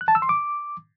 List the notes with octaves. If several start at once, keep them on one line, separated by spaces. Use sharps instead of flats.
F#6
A5
E6
C6
D6